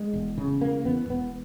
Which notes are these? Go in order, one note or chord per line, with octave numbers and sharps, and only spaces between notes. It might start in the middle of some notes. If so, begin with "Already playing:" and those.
Already playing: G#3
E1
C#3
E1 A#3
E2 B3
E1 B3